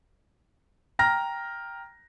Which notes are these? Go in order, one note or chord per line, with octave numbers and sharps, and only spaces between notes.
G5 A#5 F6 A#6